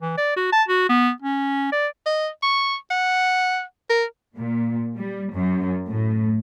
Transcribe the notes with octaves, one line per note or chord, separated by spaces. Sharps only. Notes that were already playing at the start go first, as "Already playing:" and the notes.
E3
D5
F#4
A5
F#4
B3
C#4
D5
D#5
C#6
F#5
A#4
A#2
G3
F#2
A2